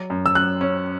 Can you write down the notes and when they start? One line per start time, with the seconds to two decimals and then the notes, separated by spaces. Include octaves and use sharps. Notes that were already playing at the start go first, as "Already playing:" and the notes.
Already playing: F#3
0.10 F#2
0.26 E6
0.35 F#2 F#6
0.61 C#4